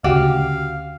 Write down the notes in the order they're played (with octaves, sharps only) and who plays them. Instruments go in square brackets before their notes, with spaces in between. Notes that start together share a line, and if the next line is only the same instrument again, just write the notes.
[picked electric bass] D2 C#3 [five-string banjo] F#4 G4 [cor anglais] F5